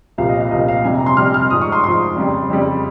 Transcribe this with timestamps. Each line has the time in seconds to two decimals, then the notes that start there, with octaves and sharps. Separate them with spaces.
0.18 C2 A#2 F3 F5
0.29 D#5
0.41 F5
0.51 C2 A#2 F3 D#5
0.68 F5
0.85 F2 C3 G3 G#5
0.95 A#5
1.06 C6
1.17 F2 C3 G3 F6
1.34 F6
1.50 G#2 F3 D#6
1.62 C#6
1.72 C6
1.83 G#2 F3 C6
2.16 F2 C#3 G3
2.50 F2 C#3 G3